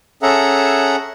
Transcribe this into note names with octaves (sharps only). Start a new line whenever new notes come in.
C#4 G#4 A4 E5 F#5 A#5